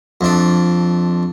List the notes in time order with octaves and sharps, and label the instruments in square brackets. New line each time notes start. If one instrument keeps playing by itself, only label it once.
[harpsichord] F2 D4